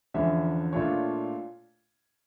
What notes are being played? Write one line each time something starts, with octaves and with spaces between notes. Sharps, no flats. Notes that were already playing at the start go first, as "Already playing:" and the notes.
E2 D3 F3 C#4 E5
A#2 A3 D4 F4 C#5